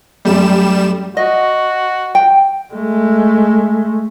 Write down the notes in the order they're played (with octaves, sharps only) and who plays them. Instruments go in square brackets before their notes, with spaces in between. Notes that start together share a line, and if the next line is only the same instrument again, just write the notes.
[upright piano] F#2 A3 [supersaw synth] G3 E7
[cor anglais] F#4 [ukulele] D#5
[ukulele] G5
[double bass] G#3 A3